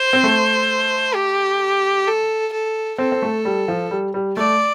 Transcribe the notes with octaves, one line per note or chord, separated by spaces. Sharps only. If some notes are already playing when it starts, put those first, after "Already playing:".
Already playing: C5
C4
A3
G4
A4
A4
C4 A4
C4
A3
G3
F3
G3
G3
A3 D5